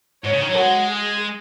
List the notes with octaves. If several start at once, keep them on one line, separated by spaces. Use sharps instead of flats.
G#2 C#5
C#3
D#3
F#3
G#3 F#4
G#4